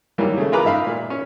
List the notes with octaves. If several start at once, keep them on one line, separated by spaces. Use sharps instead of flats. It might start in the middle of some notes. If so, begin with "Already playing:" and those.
D#3 E3 F#3 G3 A#3
C#3 A3
F4 G#4 A#4 B4 A#5 D6
G#2 E5 F5 B5
A#2
C#4